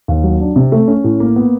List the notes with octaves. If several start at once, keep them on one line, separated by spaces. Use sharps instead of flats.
D#2
F#3
D4
C3
A3
C#4
A2
A#3
B3